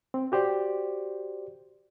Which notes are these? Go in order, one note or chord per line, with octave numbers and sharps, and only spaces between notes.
C4
F#4 G4 C5 D5